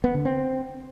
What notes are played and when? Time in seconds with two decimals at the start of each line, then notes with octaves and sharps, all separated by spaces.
0.04 B3
0.15 D3
0.25 C4